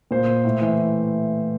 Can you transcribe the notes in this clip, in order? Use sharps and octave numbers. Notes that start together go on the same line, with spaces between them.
A#2 C5
A2
E3